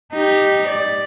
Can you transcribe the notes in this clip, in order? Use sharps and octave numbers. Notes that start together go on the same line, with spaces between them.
D#4 G4
D5